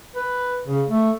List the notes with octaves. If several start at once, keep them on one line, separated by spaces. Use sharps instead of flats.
B4
C#3
A3